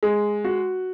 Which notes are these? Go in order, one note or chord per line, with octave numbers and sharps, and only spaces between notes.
G#3
F#4